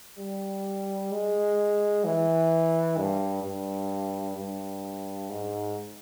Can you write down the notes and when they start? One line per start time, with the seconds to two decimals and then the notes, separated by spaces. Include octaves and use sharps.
0.18 G3
1.11 G#3
2.04 E3
2.98 G2
3.44 G2
4.37 G2
5.29 G#2